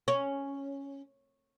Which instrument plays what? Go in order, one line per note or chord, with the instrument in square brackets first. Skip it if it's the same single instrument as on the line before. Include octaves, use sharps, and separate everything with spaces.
[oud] C#4